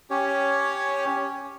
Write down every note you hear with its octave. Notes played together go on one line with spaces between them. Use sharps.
C#4 G4 C#5